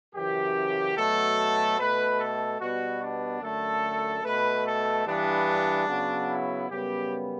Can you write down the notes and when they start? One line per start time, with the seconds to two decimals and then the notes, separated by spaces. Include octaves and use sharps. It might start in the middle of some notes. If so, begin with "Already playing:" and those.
0.14 F#2 C#3 E3 G4
0.96 B2 F#3 A3 A4
1.78 B2 A3 B4
2.19 A4
2.60 B2 G3 B3 F#4
3.01 D4
3.42 F#2 D3 A3 A4
4.24 B2 A3 B4
4.65 A4
5.06 G2 E3 G3 B3 D4
5.88 C#3 F#3 B3
6.29 E4
6.70 F#2 C#3 G3 B3 G4